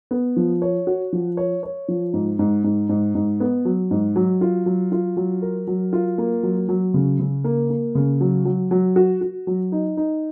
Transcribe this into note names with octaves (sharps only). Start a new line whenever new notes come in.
B3
F3
C#5
F#4
F3
C#5
C#5
F3
G#2
G#2
G#2
G#2
G#2
B3
F#3
G#2
F#3
F4
F#3
F4
F#3
A#4
F#3
F4
A#3
F#3
F#3
C#3
C#3
A#3
A#3
C#3
F#3
F#3
F#3
F#4
F#4
F#3
D#4
D#4